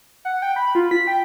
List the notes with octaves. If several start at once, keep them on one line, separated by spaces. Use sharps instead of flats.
F#5
G5
B5
F4
B6
G5